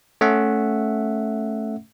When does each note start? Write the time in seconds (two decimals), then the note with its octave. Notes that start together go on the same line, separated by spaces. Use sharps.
0.21 A3 C#4 E5 F#5